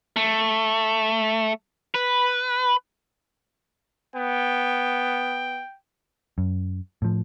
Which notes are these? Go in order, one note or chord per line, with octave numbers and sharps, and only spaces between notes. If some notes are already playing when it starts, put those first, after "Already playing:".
A3
B4
B3 G5
F#2
A2 F3